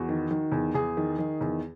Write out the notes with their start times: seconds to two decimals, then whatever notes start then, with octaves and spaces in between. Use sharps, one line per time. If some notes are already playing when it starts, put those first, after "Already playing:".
Already playing: E2 F#4
0.09 D#3
0.31 D#3
0.52 E2
0.74 E2 G#4
0.97 D#3
1.19 D#3
1.41 E2